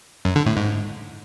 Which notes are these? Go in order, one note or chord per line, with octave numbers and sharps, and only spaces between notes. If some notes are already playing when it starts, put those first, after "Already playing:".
F#2
D3
A2
G#2